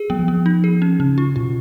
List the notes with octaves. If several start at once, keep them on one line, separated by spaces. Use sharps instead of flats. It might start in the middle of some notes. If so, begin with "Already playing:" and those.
Already playing: G#4
F#3 B3
F3
B3
D#4
G#4
C#4
C#3 C#4
F4
B2 F4